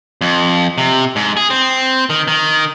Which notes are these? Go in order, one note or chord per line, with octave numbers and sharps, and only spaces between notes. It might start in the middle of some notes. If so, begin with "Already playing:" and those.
F2
C3
G#2
G#4
C4
D#3
D#3